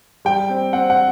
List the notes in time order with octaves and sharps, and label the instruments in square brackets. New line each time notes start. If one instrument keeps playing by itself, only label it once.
[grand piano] G3 G5
C4
C4 F#5
F#5